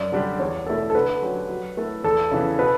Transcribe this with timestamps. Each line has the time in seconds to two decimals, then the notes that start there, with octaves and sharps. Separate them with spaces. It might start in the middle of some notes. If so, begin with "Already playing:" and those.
Already playing: F#2 D5
0.12 D3 G3 D4 G4
0.39 E2 C#5
0.67 B2 A3 E4 A4
0.90 A4
0.95 D3 B4
1.22 F#3 C#4 G4
1.49 F#3
1.77 A3 E4 A4
2.04 E2 A4
2.31 C#3 E3 B3
2.59 B2 B4